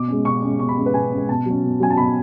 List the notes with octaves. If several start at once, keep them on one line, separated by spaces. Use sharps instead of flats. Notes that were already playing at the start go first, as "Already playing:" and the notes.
Already playing: B2 D6
G#3 C#4
B2 C#6
G#3 C#4
B2 C#6
B5
G#3 C#4
B4
B2 G#5
G#3 C#4
B2 A5
F#3 C#4
B2
F#3 C#4 G#5
A5
B2 B5